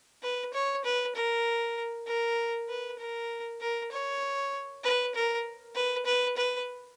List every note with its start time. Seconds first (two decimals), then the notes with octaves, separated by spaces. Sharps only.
0.23 B4
0.54 C#5
0.84 B4
1.15 A#4
2.07 A#4
2.69 B4
2.99 A#4
3.61 A#4
3.91 C#5
4.84 B4
5.15 A#4
5.75 B4
6.06 B4
6.37 B4